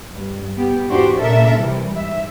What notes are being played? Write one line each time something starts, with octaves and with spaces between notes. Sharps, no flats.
G2
B3 G4
E2 G#2 D4 F#4 G4 C5
A#2 C#3 D4 A4 A#4 E5
C3 E3 G3
G#2 E5